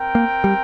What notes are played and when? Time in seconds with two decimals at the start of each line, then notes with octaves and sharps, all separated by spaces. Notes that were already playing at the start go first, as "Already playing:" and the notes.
Already playing: C4 A#4 G5
0.15 A#3
0.44 G3